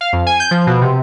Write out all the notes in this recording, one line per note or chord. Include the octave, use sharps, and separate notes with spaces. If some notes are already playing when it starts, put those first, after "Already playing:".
F5
F2
G#5
G6
F3
B2
C3